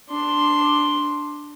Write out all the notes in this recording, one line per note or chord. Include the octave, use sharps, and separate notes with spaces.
D4 C6